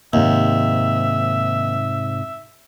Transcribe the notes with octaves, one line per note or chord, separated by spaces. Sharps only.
D#2 G#2 C3 E5